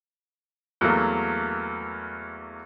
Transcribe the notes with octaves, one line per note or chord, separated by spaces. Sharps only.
E2 F#3 A3 A#3